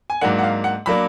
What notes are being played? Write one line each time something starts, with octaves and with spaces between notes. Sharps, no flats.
G#5
G#2 F#3 A#3 D4 F#5
F#5
F5
F#5
F#3 A#3 D4 B5